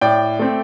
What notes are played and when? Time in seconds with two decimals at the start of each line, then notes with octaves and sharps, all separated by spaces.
0.01 A2 D5 G5
0.39 A3 C4